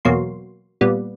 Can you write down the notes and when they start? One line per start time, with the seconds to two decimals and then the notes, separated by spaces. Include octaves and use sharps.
0.05 E2 B2 F#3 A#3 C6
0.81 A#2 G3 B3